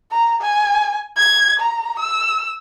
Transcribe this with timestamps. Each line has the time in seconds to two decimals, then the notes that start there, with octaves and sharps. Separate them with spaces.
0.12 A#5
0.41 G#5
1.17 G#6
1.60 A#5
2.00 E6